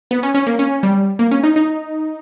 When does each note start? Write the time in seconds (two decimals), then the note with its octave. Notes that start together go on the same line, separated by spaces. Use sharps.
0.11 B3
0.23 C#4
0.34 C#4
0.47 A#3
0.59 C#4
0.83 G3
1.19 A#3
1.31 C#4
1.43 D#4
1.56 D#4